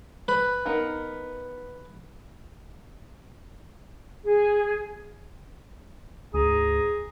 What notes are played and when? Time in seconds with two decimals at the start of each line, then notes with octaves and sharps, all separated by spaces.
0.28 B4
0.65 B3 D#4 A#4
4.23 G#4
6.34 D2 G#2 G#4 A#5 D#6